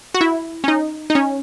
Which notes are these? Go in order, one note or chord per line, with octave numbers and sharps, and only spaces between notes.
F#4
E4
C#4
D#4
D#4
C#4